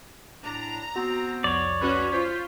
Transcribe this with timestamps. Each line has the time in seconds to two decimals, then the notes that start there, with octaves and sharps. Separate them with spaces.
0.45 A2 D4 A#5
0.96 B3 C4 F#4
1.44 C2 F2 C#5 D5
1.81 C#4 F#4 B4
2.13 F4 C5 C#6 G6 B6